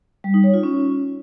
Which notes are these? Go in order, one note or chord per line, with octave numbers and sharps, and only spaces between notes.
G3
D#4
C#5
F4
C#4